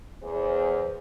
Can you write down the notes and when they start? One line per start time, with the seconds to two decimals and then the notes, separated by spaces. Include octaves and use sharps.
0.22 E2 G#4 C5